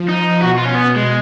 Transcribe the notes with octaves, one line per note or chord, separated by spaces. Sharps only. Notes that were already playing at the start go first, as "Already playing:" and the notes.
Already playing: F3
D#4
B2 F#4
F4
C#4
B3
G#3